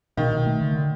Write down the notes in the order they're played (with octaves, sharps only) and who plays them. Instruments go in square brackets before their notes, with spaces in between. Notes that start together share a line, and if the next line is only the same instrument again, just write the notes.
[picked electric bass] B2 [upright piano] D#3
[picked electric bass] B2
A3
D3
D3